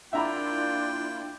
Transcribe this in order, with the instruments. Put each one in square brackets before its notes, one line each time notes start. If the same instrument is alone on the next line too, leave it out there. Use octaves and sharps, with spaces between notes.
[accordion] A#3 E4 F4 [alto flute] D4 [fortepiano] E5 A#5 B5 [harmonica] G5